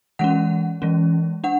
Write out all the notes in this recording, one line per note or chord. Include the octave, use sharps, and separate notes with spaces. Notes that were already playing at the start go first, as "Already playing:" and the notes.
E3 G#3 C#4 F#5
E3 G#3 C#4
D4 F#5